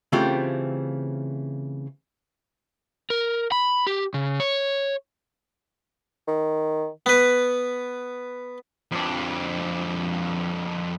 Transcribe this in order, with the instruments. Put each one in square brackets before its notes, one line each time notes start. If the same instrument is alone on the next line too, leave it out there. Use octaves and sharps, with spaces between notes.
[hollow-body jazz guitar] C#3 E3 A3 C4 F4 G4
[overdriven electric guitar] A#4
B5
G4
C#3
C#5
[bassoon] D#3
[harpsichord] B3 B4
[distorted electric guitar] F2 D4